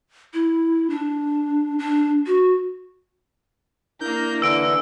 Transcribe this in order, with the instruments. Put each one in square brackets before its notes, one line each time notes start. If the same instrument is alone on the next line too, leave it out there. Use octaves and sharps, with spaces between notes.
[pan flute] E4
D4
D4
F#4
[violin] A#3 A#4 [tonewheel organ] D4 E4 [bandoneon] G6
[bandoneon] D3 E3 [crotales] E6 D7